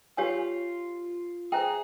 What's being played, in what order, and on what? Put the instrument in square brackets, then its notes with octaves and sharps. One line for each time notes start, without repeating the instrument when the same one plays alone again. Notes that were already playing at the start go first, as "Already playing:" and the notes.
[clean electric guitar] F4 [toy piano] G4 C#5 F5 G#5
[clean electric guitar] G#4 [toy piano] C5 E5 G5 A#5